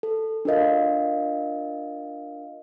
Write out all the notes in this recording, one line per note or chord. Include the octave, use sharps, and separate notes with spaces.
A4
D4 F4 A#4 D#5 F5